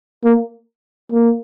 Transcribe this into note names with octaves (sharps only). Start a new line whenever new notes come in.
A#3
A#3